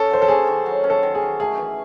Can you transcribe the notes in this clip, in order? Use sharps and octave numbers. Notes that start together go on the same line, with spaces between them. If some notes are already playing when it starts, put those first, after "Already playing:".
Already playing: C#4 A4
F#3 C5
A4
C#4 G#4
D#3
F#3
C#4
A4
D#3
G#4
D#3
A3 G#4
E3